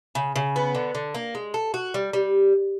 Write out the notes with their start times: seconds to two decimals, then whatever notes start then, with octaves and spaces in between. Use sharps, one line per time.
0.15 C#3
0.36 C#3
0.56 B3
0.75 D3
0.95 D3
1.14 A#3
1.35 G#3
1.54 A4
1.74 F#4
1.94 G3
2.13 G3